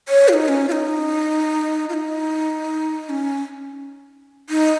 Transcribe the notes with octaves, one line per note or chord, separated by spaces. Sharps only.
C#5
F4
D#4
C#4
F4
D#4
F4
D#4
C#4
D#4